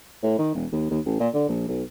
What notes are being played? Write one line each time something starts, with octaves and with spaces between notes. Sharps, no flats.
A2
D#3
E1
D#2
D#2
A1
A#2
D3
A#1
B1